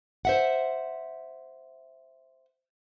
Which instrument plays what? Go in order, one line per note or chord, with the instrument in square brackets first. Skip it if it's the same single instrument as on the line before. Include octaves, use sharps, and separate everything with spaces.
[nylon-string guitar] C5 E5 F#5